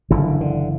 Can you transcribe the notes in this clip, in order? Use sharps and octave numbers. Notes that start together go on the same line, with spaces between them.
F#1 D3 E3
D3